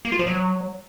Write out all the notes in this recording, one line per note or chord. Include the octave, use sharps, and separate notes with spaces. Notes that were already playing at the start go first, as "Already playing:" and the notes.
A#3
F4
F3
F#3